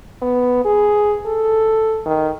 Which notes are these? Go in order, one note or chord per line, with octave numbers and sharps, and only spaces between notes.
B3
G#4
A4
D#3